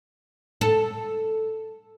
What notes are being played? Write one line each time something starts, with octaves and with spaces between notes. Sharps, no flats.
A4